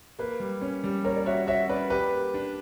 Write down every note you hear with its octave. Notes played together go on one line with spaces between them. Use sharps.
A#3 B4
G3
C#4
G3
A#3 A#4 C#5
D5
F#4 C#5 E5
F#4 C#5 E5
C#4 B4 D5
G4 B4
A#3
D4